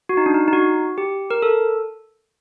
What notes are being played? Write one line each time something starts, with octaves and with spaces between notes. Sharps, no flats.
F#4
D#4
D4
D#4
D#4
F#4
G4
A#4
A4